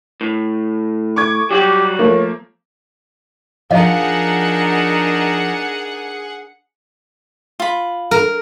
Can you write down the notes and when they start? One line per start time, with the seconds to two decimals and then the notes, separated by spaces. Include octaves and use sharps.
0.21 A2
1.16 C#6 D6 G#6
1.51 F#3 G3 F#4 G4
1.99 F3 A3 A#3 C#5
3.71 F3 D4 D#4 G#4 A#4 D#5 F5 F#5
7.60 F4 B5
8.11 A#4